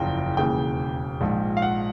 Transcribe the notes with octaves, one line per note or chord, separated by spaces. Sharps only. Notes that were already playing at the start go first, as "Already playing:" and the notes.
Already playing: F#1 E2 C#3 F3 G5
E1 D#2 C#3 E3 G5
A#1 G#2 F3
F5
F#5